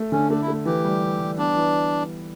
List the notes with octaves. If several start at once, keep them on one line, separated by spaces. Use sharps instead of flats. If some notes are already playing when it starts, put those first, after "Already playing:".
Already playing: A3
D3 C#4
A3 D4
E4
A3
E3 G4
G3
E3
G3
B3 D4
E3